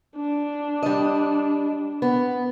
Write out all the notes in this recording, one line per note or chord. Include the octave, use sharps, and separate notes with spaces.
D4
G3 D#5
B3